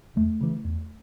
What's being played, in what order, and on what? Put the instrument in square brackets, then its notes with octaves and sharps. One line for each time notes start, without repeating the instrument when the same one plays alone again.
[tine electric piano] E2 [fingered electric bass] A3
[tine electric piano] C#3 E3
E2